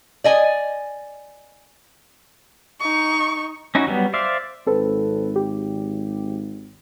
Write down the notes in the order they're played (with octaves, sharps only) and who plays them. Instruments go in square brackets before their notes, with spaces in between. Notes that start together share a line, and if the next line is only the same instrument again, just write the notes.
[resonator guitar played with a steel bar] D5 D#5 G#5
[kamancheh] D#4 C#6
[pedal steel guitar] C#4 D#4 E4 F#4
F#3 G3 B3
C5 D5 E5 F5
[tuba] G#1 [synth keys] C4 A4 B4
[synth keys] G4